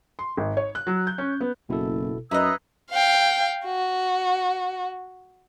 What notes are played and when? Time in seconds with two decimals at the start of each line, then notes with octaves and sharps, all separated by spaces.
0.19 C6
0.37 G#1
0.57 C#5
0.75 F#6
0.87 F#3
1.07 G6
1.18 C#4
1.41 B3
1.69 F#1 B2 E4 A4
2.31 F#2 D#4 B4 D#5 E5 B5 E6 G#6
2.91 F5 G5
3.65 F#4